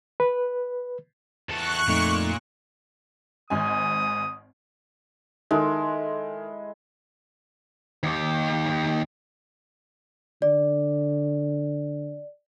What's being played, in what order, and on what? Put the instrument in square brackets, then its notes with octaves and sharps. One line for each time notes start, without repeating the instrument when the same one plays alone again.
[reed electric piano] B4
[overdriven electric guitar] E2 A4 [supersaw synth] C#6 F#6
[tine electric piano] F2 A3 D#4 [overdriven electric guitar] A#2
[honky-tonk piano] G#1 G#2 G#5 [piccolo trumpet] D#6
[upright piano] D#3 [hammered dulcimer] G#3 [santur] E4 A4
[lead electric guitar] D#2 G4
[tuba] D3 [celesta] D5